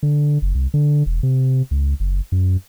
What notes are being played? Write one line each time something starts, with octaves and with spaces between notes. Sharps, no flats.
D3
F#1
C2
D3
E1
C3
C#2
F#1
F#2